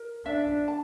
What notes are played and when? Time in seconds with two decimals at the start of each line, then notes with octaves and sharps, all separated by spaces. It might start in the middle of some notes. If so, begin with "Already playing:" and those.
Already playing: A#4
0.26 D4 E5
0.68 A5